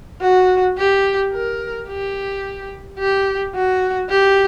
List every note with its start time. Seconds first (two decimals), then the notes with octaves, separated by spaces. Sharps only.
0.21 F#4
0.78 G4
1.33 A#4
1.88 G4
2.99 G4
3.54 F#4
4.09 G4